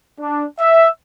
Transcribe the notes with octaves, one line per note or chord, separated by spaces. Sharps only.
D4
E5